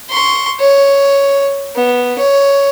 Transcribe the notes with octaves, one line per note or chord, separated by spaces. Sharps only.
C6 C#6
C#5
B3
C#5